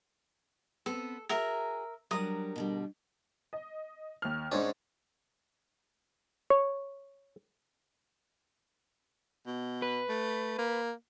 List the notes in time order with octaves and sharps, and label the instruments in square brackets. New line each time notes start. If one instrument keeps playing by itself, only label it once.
[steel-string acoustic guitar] B3 C4 [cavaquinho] A4
[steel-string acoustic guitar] F#4 G#4 [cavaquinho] A#4 E5 A#5
[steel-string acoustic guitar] F#3 G3 D4 [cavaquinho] A#4 D#6
[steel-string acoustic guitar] B2 D3 G3
[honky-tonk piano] D#5
D#2 F6
[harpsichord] G#2 C#4 [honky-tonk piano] D4 C5 C#5
[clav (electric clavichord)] C#5
[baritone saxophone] B2
[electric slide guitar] B4
[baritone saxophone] A3
A#3